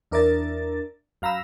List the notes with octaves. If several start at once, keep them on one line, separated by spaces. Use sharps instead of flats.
E2 D4 A#4 D5 E5 A6
F#2 F5 A#5 B5 E6